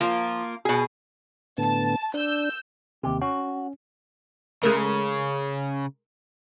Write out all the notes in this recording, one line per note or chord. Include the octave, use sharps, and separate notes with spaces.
F3 A#3 F4
B2 G#4
A2 D3 B3 A5
D4 E6 G6
D#2 C3 G4
C#4 F#4
C#3 G#3 A3 A#4